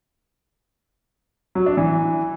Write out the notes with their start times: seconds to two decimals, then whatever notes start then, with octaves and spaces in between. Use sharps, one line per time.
1.55 F#3
1.66 D4
1.77 E3